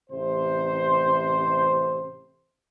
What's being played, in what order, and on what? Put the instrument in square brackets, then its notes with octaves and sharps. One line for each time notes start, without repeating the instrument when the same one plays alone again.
[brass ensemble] A1 C3 C5